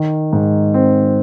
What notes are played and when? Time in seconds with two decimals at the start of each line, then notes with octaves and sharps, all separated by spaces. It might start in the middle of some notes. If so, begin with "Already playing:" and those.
Already playing: D#3
0.33 G#2
0.74 C4